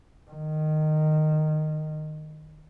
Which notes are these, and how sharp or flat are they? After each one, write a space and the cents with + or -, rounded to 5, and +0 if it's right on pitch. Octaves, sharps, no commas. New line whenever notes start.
D#3 -15